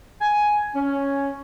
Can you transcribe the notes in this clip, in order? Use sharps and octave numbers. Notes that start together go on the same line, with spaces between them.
G#5
C#4